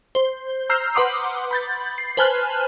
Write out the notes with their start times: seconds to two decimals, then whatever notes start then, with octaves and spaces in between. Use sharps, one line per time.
0.15 C5
0.70 A#5 E6 F6 G6 C7
0.95 B4 F#5 C6 D6 D#6
1.51 B5 G6 A6
1.98 C7
2.17 B4 C5 G#5 A5 F6 F#6